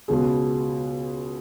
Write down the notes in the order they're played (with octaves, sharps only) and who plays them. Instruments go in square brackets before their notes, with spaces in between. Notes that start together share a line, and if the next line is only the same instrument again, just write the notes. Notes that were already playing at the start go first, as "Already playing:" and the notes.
[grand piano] C#2 B2 B3 G#4